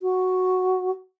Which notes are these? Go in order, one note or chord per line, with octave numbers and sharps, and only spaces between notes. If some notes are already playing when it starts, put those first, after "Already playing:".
F#4